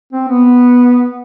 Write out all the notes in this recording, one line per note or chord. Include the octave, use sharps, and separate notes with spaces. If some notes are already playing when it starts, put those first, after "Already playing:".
C4
B3